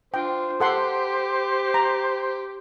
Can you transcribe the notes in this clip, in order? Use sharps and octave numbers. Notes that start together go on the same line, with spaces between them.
D4 F4 C5 G5
G4 A4 F#5 C6
A#5